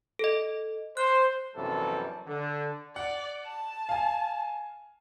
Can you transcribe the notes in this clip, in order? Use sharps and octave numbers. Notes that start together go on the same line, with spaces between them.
A4 D#5
C5 F#6
A#1 F#2 C3 E3 G3 A4
D3
D5 F#5
A5
F5 G#5